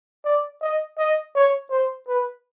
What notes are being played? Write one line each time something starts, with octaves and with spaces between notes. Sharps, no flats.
D5
D#5
D#5
C#5
C5
B4